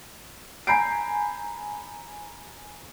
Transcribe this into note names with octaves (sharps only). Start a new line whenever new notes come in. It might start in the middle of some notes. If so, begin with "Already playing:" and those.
G#5 A#5 B5 G6 C7 D7